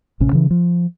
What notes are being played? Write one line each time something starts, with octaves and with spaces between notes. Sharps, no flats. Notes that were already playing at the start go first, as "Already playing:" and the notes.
A1 C3 C#4
C#3 E3
F3